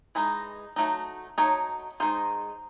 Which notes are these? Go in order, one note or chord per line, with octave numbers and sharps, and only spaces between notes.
E3 G#3 D#4
F#3 A3 D#4
F#3 A3 D#4 C#5
D#3 G#3 D#4 C5